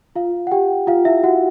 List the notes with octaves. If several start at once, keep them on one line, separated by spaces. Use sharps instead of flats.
F4 F5
F#5
G4 G5
F4 F5
E4 E5
F#4 F#5